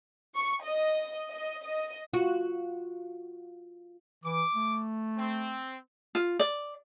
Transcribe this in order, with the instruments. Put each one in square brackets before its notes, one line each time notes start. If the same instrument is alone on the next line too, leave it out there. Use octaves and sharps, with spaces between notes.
[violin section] C#6
D#5
D#5
D#5
[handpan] F4 [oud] F#4
[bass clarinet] E3 [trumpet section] D6
[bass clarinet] A3
[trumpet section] C4
[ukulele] F4
D5